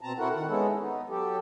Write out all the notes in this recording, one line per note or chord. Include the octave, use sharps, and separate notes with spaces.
B2 C4 A5 A#5
C4 E4 F#4 A4 A#4 F#5
D#3 F#5
G#3 B3 C#4 D#4 E4 A4
B3 D#4
F#3 G4 A4